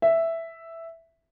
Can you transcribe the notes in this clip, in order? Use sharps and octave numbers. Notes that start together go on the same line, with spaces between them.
E5